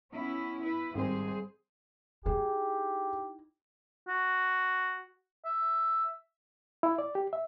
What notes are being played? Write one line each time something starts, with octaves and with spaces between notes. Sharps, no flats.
B3 C#4 E4
E4 B4
G#1 G3 C4 G#4 C5
D#4 E4 G4 G#4
F#4
E5
E4
D5
G4
E5